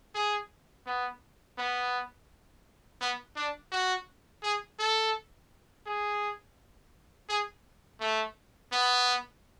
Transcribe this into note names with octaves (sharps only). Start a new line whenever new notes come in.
G#4
B3
B3
B3
D4
F#4
G#4
A4
G#4
G#4
A3
B3